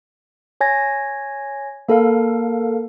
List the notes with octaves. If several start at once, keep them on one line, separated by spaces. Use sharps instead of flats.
C#5 G#5 G#6 A#6
A#3 A4 A#4 F5